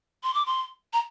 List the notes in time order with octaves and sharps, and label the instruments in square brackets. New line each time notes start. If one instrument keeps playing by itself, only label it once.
[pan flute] C6
D6
C6
A#5